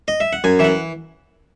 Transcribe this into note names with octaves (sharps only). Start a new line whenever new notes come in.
D#5
E5
F#5
F#2 G#5
E3 E5
F#5